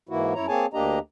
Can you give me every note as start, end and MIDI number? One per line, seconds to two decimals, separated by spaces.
0.09 0.34 44
0.09 0.34 52
0.09 0.34 58
0.09 0.34 64
0.09 0.34 66
0.35 0.47 42
0.35 0.47 64
0.35 0.47 73
0.35 0.47 82
0.48 0.66 58
0.48 0.66 60
0.48 0.66 68
0.48 0.66 73
0.48 0.66 80
0.48 0.66 81
0.74 0.99 38
0.74 0.99 58
0.74 0.99 62
0.74 0.99 67
0.74 0.99 75
0.74 0.99 82